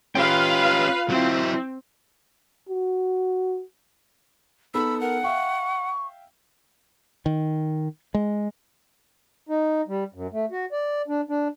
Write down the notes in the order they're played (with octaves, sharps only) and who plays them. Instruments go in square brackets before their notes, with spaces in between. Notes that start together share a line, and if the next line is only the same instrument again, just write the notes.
[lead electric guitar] C#4 G4 [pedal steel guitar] F4 G5 [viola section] B4 F5
[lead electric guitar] F#3 E4 [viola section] C4
[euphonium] F#4
[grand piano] B3 D#4 A4 [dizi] B5 [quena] E6
[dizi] A#4 [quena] F#5
[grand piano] E5 F5 G5 [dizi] C#6
[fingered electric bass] D#3
G#3
[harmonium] D#4
G3
F#2
A3
F#4
D5
D4
D4